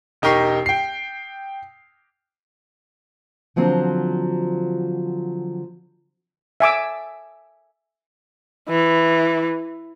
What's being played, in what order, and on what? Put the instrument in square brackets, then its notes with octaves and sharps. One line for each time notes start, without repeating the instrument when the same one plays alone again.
[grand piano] E1 D#4 G4 A#4 C#6 C7
G5 C7
[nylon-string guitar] D3 F3 F#3 C4
[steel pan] E5 G#5 D6 E6
[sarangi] E3